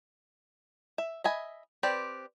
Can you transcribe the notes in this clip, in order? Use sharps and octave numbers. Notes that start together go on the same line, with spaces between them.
E5
D#5 E5 G#5 B5
C4 G4 B4 D5